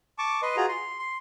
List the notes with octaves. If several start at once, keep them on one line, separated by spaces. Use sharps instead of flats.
A5 C#6 D6
B4 D#5 C6
F4 F#4 G#4 A#5
C6
C6